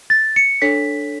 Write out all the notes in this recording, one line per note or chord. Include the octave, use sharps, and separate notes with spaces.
A6
C#7
D4 A4 C#5 B6